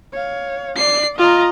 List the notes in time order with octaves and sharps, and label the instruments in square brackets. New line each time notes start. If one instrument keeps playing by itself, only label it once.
[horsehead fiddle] C#5 F5
[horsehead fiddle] D5 [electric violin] C7
[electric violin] F4 [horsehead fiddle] D#5 A#5